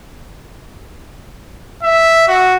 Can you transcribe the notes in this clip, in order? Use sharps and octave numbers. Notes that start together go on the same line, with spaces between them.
E5
F#4